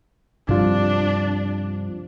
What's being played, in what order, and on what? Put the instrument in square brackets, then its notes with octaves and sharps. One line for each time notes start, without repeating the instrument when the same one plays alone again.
[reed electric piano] C2 F4 [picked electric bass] G2 C3 F3 [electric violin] D4